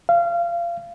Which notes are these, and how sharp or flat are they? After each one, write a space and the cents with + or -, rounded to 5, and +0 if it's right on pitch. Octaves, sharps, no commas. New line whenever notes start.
F5 -25